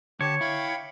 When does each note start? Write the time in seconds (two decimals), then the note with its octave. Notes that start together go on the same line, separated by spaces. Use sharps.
0.21 D3 G4 C#5 A5
0.41 E4 F5 G5 B5